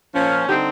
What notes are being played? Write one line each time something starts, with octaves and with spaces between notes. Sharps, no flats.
A#2 F3 A#3 C#4
D3 G3 C4 D#4 G4